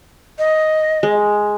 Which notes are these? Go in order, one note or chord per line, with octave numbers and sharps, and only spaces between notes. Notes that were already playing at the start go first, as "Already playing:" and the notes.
D#5
G#3